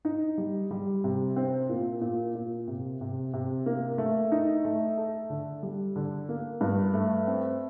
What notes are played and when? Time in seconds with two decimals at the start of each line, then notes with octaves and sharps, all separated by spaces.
0.05 D#4
0.38 G3
0.71 G3
1.04 C3
1.36 C4
1.69 A#2
2.01 A#2
2.35 A#2
2.67 C3
3.01 C3
3.33 C3
3.66 A#3
3.98 A3
4.32 D#4
4.65 A3
4.98 A4
5.30 D3
5.63 G3
5.96 D3
6.29 A#3
6.61 G2
6.94 A3
7.27 C4